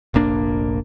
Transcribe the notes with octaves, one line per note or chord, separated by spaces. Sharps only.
F1 A#1 A#3 D4